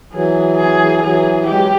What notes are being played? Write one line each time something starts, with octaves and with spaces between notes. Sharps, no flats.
E3 F#3 G#4
G#4
E3 F#3 G#4
F#3 G#3 G4